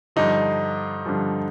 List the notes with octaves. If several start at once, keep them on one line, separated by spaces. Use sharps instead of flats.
G2 D3 F3 D#4
G2 D3 F3